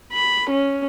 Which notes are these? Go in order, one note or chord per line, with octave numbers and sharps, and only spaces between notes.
B5
C#4